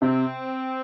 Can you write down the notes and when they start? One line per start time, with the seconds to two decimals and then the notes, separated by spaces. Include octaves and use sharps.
0.02 C3 C4